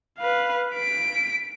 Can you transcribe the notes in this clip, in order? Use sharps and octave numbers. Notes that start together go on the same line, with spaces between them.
B4 F5
B6 D7